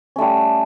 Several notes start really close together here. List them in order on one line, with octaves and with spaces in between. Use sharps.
C#4 A3 G3